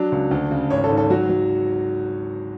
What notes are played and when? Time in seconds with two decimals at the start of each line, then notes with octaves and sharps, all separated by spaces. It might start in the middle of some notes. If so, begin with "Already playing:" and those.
Already playing: F#3 D4
0.12 C#2
0.31 D2
0.51 C#3
0.70 G#1 C#5
0.84 A4
0.90 G#2
0.97 A4
1.10 F#3 F#4
1.29 F#3